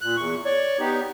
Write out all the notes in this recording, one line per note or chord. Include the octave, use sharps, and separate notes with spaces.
A#2 F#6
E2 C#6
C#5 D5 C#6
B3 D#4 G4